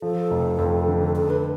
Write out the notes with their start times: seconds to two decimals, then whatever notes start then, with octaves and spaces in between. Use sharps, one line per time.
0.02 F3 A4
0.30 F1
0.58 F2
0.88 D3
1.16 D4 A4
1.30 B4